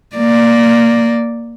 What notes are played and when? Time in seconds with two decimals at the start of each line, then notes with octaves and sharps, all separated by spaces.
0.16 A#3 D5